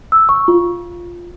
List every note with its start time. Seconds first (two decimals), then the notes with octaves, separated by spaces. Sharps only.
0.12 E6
0.29 C#6
0.48 F4